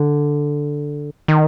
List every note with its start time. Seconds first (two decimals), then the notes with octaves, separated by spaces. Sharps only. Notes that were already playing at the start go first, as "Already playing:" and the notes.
Already playing: D3
1.28 D#3